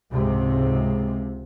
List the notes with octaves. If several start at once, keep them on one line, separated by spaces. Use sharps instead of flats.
C#2 G#2 C3